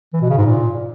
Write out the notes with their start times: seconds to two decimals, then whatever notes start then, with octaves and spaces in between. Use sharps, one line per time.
0.13 E3
0.21 B2
0.29 C#3
0.37 G#2
0.45 A#2